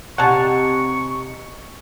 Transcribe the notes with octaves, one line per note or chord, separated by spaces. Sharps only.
C3 D#4 F#5 G#5 A5 C#6